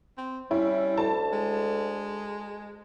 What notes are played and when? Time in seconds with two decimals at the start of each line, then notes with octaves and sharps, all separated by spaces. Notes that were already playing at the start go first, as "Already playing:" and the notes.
0.18 C4
0.51 G3 C#4 E4
0.98 D2 A5
1.32 G#3